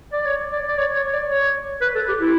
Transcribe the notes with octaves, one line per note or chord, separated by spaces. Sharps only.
D5
C#5
D5
D5
C#5
C#5
D5
C#5
B4
A4
G4
E4